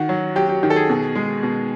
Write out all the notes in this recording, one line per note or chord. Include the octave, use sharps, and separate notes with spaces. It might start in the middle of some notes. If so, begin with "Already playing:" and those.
Already playing: D#3 F#4
F#3
F#3 G4
G4
D#3 G4
A4
G#4
B2
G#3
B2